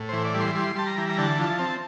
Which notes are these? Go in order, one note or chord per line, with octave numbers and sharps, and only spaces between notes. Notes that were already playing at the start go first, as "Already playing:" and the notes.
Already playing: A2
E3 C5
D5
G3
C6
G3 C6
G3 A5
A#5
E3
A#5
D3 A5
F3
C4